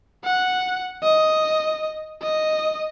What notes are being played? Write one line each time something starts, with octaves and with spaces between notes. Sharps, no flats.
F#5
D#5
D#5